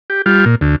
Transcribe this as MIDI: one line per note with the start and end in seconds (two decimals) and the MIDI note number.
0.10 0.22 67
0.26 0.45 55
0.26 0.45 65
0.46 0.55 46
0.61 0.76 38